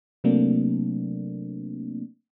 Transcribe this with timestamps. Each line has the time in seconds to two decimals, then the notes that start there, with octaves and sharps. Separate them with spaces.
0.24 C3 F#3 A3 A#3 C4 D4